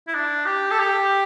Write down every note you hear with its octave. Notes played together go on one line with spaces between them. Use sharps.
E4
D4
G4
A4
G4